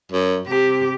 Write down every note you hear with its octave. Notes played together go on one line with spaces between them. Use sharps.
F#2
C3 G4